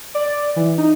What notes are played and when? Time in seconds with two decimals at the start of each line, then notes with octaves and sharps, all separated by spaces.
0.15 D5
0.56 E3
0.78 D#4